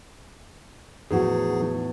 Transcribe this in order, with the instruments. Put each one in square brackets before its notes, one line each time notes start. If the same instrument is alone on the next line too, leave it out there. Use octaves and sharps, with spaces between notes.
[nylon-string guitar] E2 A2 F#4 [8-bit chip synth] F3 D#4 G#4